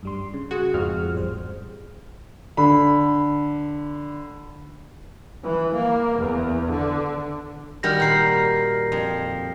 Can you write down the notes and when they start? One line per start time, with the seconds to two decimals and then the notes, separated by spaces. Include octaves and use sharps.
0.03 G2 G3 C6
0.34 C#3
0.51 F#4 G#4
0.74 F2 G#2 F6
1.13 A1 G3 C5
2.57 D3 B5
5.42 E3
5.74 A#3
6.18 E2
6.70 D3
7.83 D#3 G3 F#4 F6 G6 A#6
8.00 A#2 A#4 B5 G6 C7
8.92 F2